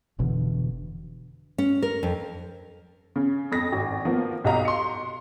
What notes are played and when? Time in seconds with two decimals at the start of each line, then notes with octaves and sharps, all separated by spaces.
0.19 F1 B2 D3 E3
1.58 C#4
1.82 A#4
2.03 F2
3.16 C#3
3.52 F2 A#6
3.72 G#1
4.05 F3 A#3 B3
4.44 B1 F#4 G4 D#5 F5 A#5
4.65 C6 C#7